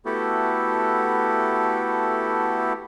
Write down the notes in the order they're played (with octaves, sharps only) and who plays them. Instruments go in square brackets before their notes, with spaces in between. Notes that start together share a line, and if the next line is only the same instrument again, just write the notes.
[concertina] A3 B3 E4 F#4 G4 A4